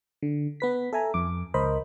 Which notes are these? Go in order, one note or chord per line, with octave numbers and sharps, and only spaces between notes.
D3
B3 B4 B6
A4 E5 G#5 A#5
F2 D6
C#2 A#4 C5 D#5 B5